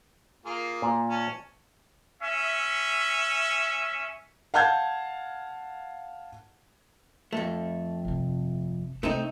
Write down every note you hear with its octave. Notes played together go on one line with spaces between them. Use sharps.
A#3 F4 G#4
A#2
C#4 A5
C#4 E5
F5 F#5 A5 G6 G#6
F2 A3
G1 C3
C3 A3 C4 D#4